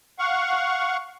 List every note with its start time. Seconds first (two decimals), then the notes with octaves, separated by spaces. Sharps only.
0.19 F5 F#5 C#6